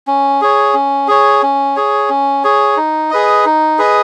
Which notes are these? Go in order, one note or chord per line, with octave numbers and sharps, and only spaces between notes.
C#4
G#4 C#5
C#4
G#4 C#5
C#4
G#4 C#5
C#4
G#4 C#5
D#4
G#4 B4 D#5
D#4
G#4 B4 D#5